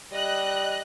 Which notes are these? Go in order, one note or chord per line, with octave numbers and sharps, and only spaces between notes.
G3 D#5 F#6